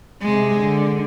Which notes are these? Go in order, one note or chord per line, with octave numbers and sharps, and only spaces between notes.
C3 G#3
D3